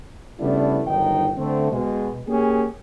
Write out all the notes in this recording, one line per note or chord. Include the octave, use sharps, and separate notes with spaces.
C#3 G3 A3 B3 D4 E4
G1 D#3 F#3 D#4 G5
D3 A3 C4
B2 G#3
A#3 C#4 G4 G#4